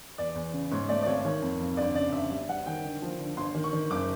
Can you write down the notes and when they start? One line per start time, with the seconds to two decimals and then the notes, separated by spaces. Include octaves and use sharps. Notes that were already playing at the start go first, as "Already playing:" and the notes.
0.18 E2 D5
0.35 E2
0.53 C#3
0.71 G#2 C#5
0.89 A3 D5
1.03 D5
1.06 G#1 C#5
1.25 D#3 C#5
1.42 F2
1.59 F2
1.77 G1 D5
1.95 C#3 D5
2.12 G1 E5
2.30 G3 E5
2.49 G3 F#5
2.66 D#3 G5
2.84 D3
3.02 F3
3.19 D3
3.37 G1 C6
3.55 D#3
3.64 C#6
3.73 D#3
3.91 F#1 D6